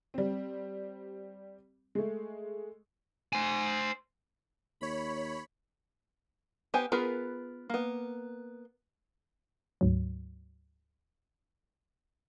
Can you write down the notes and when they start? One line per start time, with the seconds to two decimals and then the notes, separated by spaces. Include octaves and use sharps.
0.14 G3 C4
1.95 G#3 A3
3.33 C5 G#5
4.81 D#2 C#5 B5
6.74 B3 G4 C5 G5 G#5
6.92 B3 F4 G#4 A#4 B4
7.70 A#3 B3
9.81 D2 G#2 F#3